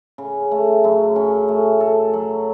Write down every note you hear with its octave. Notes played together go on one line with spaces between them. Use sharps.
C#3
A3
F#2
C#4
A3
A4
F#3